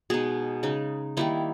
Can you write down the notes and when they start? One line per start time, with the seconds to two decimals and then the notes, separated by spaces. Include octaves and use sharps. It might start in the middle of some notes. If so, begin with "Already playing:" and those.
0.10 B2 G#3 D#4 G#4
0.63 C#3 G#3 D#4
1.17 D#3 G3 A#3 D#4 E4